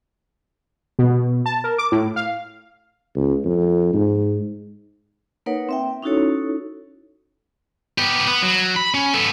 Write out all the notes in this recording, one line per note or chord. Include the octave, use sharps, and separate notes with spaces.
B2
A5
A#4
D6
A2
F5
C#2
F2
G#2
A#3 D#4 A#4 B4 C#5 F#5
C4 E5 G5
C#4 D#4 E4 F#4 A4 C#5
B3 G4
B3
F#3
B5
C#4
B3 A4